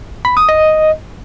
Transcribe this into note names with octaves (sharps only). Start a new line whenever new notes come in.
B5
D#6
D#5